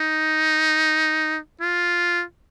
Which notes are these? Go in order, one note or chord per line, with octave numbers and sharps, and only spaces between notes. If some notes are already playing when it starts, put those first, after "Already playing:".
Already playing: D#4
F4